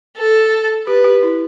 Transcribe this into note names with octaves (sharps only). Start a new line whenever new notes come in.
A4
G4 B4
G4
E4